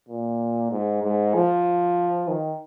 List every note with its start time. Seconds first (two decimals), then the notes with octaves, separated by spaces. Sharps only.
0.09 A#2
0.71 G#2
1.03 G#2
1.35 F3
2.28 D#3